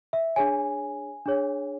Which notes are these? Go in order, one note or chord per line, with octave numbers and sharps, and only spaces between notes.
E5
D4 G#4 C#5 G#5
D4 G#4 C#5